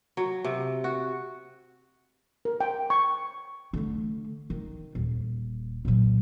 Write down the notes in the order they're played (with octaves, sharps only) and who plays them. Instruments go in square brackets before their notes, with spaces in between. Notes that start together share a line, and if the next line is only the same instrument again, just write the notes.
[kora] F#3
C3
F#4
[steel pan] A#4
G5
C#6
[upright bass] D3 A3
D#3
D#1
A#2 F#3